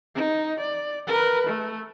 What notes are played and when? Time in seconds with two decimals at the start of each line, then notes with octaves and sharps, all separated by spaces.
0.16 D#4
0.60 D5
1.07 A#4 B4
1.47 A3